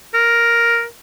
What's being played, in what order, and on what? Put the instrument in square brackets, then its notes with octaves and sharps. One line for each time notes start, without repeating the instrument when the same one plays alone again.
[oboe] A#4